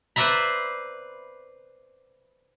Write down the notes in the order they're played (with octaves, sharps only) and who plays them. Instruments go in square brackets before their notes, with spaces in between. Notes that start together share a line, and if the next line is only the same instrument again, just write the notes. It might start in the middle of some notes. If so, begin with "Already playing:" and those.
[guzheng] B4 C5 D5 E5 A#5 B5